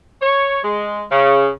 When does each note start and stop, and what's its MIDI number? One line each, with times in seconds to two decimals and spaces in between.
0.21 0.59 73
0.64 1.03 56
1.11 1.49 49